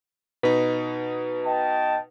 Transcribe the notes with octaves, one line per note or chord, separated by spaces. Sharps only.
B2 D#4 B4
D#5 G5 A5